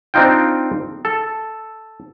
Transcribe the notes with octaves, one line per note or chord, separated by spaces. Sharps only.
C4 D4 D#4 F4 G5
A4